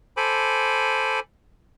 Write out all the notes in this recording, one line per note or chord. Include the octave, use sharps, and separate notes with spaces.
A4 C5 G#5 B5 D6